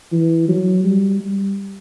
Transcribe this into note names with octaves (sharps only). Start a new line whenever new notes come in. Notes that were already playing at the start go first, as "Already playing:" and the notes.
E3
F#3
G3
G3